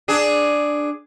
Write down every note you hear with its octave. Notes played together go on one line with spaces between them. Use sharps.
D4 G#4